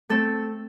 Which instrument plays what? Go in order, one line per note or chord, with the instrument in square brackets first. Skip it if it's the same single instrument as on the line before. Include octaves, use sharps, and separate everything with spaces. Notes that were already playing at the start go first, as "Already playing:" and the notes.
[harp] A3 C4 A4